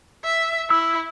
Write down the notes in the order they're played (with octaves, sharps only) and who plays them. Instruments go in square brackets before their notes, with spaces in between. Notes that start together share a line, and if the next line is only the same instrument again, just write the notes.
[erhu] E5
[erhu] E4 [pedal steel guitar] E6